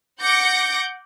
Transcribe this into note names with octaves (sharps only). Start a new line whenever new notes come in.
F#5 D6 G6 A#6 C#7